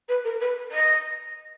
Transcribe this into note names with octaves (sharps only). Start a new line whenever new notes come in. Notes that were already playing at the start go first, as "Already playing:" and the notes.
B4
A#4
B4
D#5